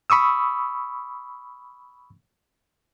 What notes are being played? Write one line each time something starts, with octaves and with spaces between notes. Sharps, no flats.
B5 C#6 D#6 E6